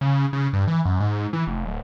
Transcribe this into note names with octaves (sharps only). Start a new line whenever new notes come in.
C#3
C#3
G2
E3
F#2
G#2
E3
F1
D1